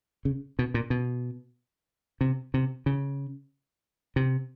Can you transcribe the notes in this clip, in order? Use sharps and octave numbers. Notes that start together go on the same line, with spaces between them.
C#3
B2
A#2
B2
C3
C3
C#3
C3